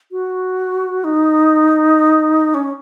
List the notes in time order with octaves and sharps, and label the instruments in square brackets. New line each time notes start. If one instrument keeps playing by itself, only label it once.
[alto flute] F#4
D#4
C#4